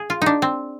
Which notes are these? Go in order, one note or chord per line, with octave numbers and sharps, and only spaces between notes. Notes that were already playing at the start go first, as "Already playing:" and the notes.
Already playing: G#4
F4
D4 D#4
C4